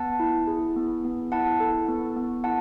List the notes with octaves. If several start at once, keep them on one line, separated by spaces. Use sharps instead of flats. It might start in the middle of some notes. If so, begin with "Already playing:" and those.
Already playing: B3 F#5 A5
E4
G#4
B3
B3
E4 F#5 A5
A4
B3
B3
E4 F#5 A5